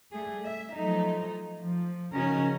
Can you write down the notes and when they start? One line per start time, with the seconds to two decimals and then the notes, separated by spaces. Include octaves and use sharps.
0.12 G3 A3 G#4
0.45 E5
0.75 F3 F#3 A3 D#4
1.60 F3
2.14 C#3 F3 C#4 D#4 F#4 A#4